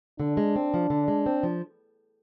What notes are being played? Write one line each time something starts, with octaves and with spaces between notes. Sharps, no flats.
D3 D4
G#3
C4
F3
D3
G#3
C4
F3